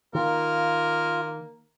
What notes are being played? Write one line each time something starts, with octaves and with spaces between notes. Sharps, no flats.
D#3 A#3 F4 A#4